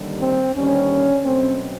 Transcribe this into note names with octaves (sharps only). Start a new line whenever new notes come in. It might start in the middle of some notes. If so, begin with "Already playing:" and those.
Already playing: D#2 D3 G3
C4
D#2 D3 G3 C#4
B2 F#3 A3 C4